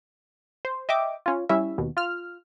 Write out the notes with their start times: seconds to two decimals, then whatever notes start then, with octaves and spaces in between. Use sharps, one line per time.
0.65 C5
0.89 D#5 E5 G5 D6
1.26 C#4 F4
1.49 G3 C#4 E4 E5
1.78 D#2 B2
1.97 F4 F6